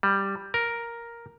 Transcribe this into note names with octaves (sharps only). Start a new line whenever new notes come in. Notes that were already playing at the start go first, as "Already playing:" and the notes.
G3
A#4